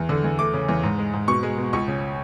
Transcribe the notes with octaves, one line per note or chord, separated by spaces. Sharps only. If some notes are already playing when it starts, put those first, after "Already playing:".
Already playing: E2
D3
E2
A3 D6
C#3
E2
G#2
G#3
G#2
B2 C#6
G#3
B2
C#2 C#6
C#3